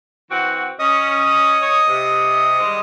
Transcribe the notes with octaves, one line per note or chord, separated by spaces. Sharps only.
E3 C4 F#4
C#4 D#5 D#6
C#5
C3
D#3 G3 G#3